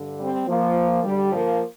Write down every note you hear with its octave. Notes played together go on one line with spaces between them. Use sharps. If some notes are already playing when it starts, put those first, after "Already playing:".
Already playing: G2 D3
G3 C4
F3 A#3
G2 D3 G3
F3 A#3